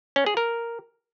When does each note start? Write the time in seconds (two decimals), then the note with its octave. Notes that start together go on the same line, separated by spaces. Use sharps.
0.16 C#4
0.26 G#4
0.37 A#4